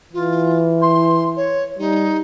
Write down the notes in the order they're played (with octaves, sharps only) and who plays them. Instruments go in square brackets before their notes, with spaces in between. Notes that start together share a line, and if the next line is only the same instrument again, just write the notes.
[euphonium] E3 [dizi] F4
[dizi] C6
C#5
[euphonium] G3 [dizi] D#4